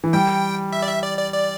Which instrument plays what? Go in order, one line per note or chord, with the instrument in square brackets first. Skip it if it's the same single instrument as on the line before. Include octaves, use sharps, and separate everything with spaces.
[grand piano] E3
[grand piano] G3 [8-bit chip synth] G5
[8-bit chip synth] E5
D5
E5
D5
D5
D5